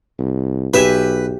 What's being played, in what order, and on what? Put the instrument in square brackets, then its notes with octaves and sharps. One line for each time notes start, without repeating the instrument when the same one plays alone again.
[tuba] C2
[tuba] B1 [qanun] G4 E5 G#5 [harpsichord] B4